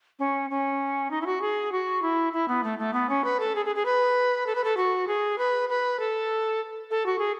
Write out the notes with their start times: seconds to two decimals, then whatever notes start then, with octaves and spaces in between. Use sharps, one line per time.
0.19 C#4
0.50 C#4
1.11 D#4
1.21 E4
1.26 F#4
1.41 G#4
1.72 F#4
2.02 E4
2.33 E4
2.48 B3
2.63 A3
2.79 A3
2.93 B3
3.09 C#4
3.24 B4
3.40 A4
3.55 G#4
3.65 G#4
3.75 G#4
3.85 B4
4.46 A4
4.55 B4
4.64 A4
4.77 F#4
5.07 G#4
5.38 B4
5.69 B4
6.00 A4
6.91 A4
7.06 F#4
7.19 G#4